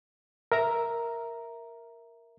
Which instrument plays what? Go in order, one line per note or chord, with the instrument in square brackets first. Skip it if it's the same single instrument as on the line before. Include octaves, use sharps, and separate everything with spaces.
[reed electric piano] A#4 E5 A#5